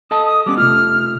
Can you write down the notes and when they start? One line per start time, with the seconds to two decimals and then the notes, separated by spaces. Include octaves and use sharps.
0.11 A4 D#5 A5 D#6
0.26 D#6
0.46 G3 B3 C#4 D6
0.57 C3 A3 F4 F6